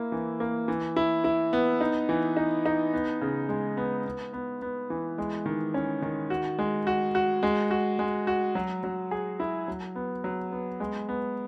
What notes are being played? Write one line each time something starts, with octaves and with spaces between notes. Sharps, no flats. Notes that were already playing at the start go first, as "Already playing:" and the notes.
Already playing: A#3 E4
E3
A#3
E3
E4
E4
B3
D#4
E3
D#4
D#4
B3
C#3
G#3
B3
B3
B3
B3
E3
G#3
D#3
C#4
D#3
F#4
G#3
F#4
F#4
G#3
F#4
G#3
F#4
F#3
F#3
G#4
E4
F#3
B3
F#3
B3
G#3
B3